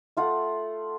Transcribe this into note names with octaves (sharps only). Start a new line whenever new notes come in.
A3 F4 F#5 D#6